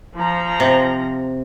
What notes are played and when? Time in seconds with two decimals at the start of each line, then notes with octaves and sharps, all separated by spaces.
0.16 F3 A#5
0.60 C3